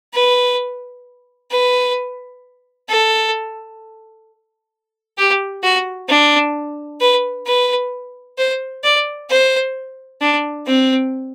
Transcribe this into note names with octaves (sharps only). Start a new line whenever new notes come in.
B4
B4
A4
G4
F#4
D4
B4
B4
C5
D5
C5
D4
C4